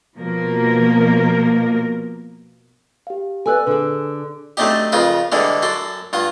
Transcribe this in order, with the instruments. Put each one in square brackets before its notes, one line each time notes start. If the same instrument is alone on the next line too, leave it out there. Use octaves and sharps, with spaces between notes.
[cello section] B2 F3 A#3 A#4
[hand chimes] G4 F5
[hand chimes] A4 E6 F#6 [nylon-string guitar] B4 D5 G#5
[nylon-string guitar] D3 G#4
[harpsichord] F#3 A3 C4 D4 D#4 G4
F2 C#3 F4 A#4 B4
D3 E3 G3 G#3 C#4 D4
F#2 F#4 A4 C6 D6
G2 F4 F#5